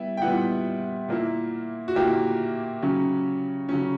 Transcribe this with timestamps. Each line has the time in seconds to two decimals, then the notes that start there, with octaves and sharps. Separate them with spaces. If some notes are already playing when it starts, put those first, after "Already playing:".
Already playing: G3 B3 E4
0.17 G5
0.22 A#2 G3 B3 E4 F#5
1.08 A#2 A#3 E4
1.88 F#4
1.95 A#2 A#3 E4 G4
2.82 C#3 F#3 C#4
3.69 C#3 F#3 C#4